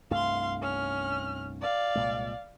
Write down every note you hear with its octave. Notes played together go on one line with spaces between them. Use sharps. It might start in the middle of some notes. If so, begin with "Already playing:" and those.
C2 G2 A3 F5 C6
C#4 F6
D5 F5
C2 A#2 G#3